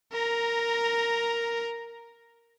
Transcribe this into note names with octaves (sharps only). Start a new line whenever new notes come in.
A#4 A#5